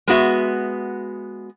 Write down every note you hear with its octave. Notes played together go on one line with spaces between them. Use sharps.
G#3 B3 F#4 E5